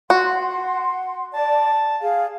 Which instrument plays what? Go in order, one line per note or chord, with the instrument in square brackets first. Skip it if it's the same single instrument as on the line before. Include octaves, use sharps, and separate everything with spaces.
[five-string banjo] F#4 [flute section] F#5 C6
[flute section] D5 [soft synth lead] A5
[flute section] G#4 F5